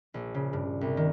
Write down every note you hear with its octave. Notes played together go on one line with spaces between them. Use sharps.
A#1
C#3
G2
C2
D#3